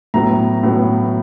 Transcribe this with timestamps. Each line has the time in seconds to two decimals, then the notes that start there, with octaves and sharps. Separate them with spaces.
0.14 A2 F#3 B3 A#5
0.63 A2 F#3 B3